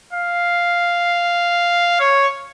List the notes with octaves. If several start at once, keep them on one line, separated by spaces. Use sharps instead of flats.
F5
C#5